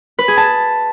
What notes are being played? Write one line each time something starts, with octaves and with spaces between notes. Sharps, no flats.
B4
G#4
A5